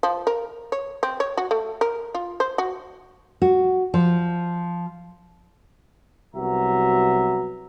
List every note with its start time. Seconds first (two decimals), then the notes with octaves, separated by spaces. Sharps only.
0.03 F3
0.27 A#4
0.72 C#5
1.03 C4
1.20 C#5
1.37 F#4
1.51 A3
1.81 A#4
2.15 F4
2.40 C5
2.58 F#4
3.42 F#4
3.94 F3
6.35 C2 F#3 B3 F#4 E5 A#5